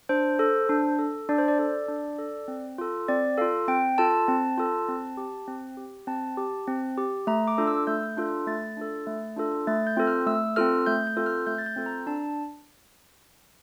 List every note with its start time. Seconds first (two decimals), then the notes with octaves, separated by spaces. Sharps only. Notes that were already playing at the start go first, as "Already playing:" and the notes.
0.09 D4 C5
0.39 A4
0.69 D4
0.99 A4
1.29 D4 D5
1.38 C5
1.48 D5
1.58 A4 D5
1.88 D4
2.19 A4
2.48 C4
2.78 F4 A4
3.08 C4 D5
3.38 F4 A4 F5
3.68 C4 G5
3.98 F4 A4 A5
4.28 C4 A5
4.57 F4 A4
4.88 C4
5.17 G4
5.48 C4
5.77 G4
6.07 C4 A5
6.37 G4
6.67 C4
6.98 G4
7.27 A3 A#5
7.48 D6
7.58 D4 F4 A4
7.67 E6
7.87 A3 G6
8.17 D4 F4 A4
8.47 A3 A6
8.77 D4 F4 A4
9.07 A3
9.37 D4 F4 A4
9.67 A3 A6
9.87 G6
9.97 C4 F4 A4
10.07 F6
10.26 A3 E6
10.56 C4 F4 A4 F6
10.86 A3 G6
11.07 G6
11.17 C4 F4 A4
11.26 F6
11.46 A3 G6
11.58 A6
11.66 G6
11.76 C4 F4 A4
11.86 A#5
12.07 D4 A5